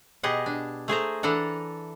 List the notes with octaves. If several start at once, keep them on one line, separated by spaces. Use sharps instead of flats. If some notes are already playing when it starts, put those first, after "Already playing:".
B2 G4 G#4 D#5 F#5
D4
A3 G#4 C5 A#5
E3 D4 A4 F#5 A#5